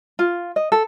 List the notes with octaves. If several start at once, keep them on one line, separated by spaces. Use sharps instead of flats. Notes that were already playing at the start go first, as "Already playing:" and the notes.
F4
D#5
A4